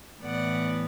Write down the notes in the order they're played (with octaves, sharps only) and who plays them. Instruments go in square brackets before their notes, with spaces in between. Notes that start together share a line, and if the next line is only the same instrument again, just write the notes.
[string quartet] A2 E3 B3 D5 F#5